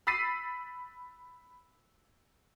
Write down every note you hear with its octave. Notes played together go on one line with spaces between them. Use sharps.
B5 E6 A6 B6 C7 D#7